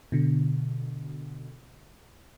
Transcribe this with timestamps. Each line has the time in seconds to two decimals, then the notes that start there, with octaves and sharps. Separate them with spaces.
0.12 B2 D3